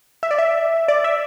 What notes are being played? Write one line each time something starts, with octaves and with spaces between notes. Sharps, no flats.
E5
D5
E5
D5
E5